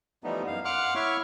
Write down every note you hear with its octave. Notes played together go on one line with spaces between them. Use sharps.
E3 F3 G3 A3 B3 D#4
F#2 F5
F5 F#5 C6 D6 F6 F#6
E4 C#5 E5 C#6 F6